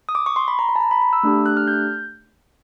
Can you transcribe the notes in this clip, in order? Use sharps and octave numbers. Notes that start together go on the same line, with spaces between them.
D#6
D6
C#6
C6
B5
A#5
B5
A5
A#5
B5
B5
E6
A3 D4 G4
F#6
F6
G6